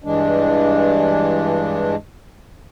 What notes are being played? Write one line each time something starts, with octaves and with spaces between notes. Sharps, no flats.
G2 E3 G#3 D4